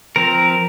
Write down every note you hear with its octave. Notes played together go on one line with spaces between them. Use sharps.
F3 C4 A#4